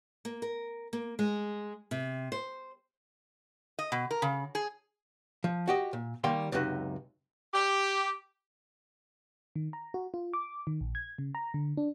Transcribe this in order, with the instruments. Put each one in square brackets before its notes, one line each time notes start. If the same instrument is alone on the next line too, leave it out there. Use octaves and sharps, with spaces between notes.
[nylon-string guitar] A#3
A#4
A#3
G#3
C3
C5
[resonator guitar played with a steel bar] D#5
B2
A#4
C#3
G#4
[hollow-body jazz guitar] F3
F#4 G4 D#5
A#2
D#3 G3 A#3 F5 G5 C6
C#2 F#2 C3 D#4 F#4 B4
[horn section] G4
[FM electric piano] D#3
A#5
F#4
F4
D6
D#3
A#1
G#6
C#3
A#5
D3
D4